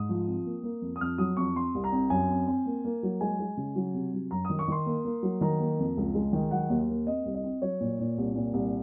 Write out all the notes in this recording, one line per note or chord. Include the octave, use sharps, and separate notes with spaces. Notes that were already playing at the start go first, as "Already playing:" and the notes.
Already playing: G#2 D#6
F3
C4
A#3
A#3
F2
D#6
F2 F6
F#3 D#6
F2 C#6
C4 C6
C2
A#5
C4
F#2 G#5
C4
C4
A#3
A#3
F#3
G#3 G#5
G#3
C#3
F#3
C3
F#3
F#2 A#5
D#3 D#6
C#6
D#3 C6
A#3
A#3
F#3
D#3 A#5
A#3
F2
C#2
G#3
D#3
F#3 F#5
D#2
A#3
C4 D#5
C2
D#5
C4
F#3 C#5
A#2
A#2
C2
A#2
C2